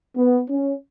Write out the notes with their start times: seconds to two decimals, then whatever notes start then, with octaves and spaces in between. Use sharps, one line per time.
0.16 B3
0.49 C#4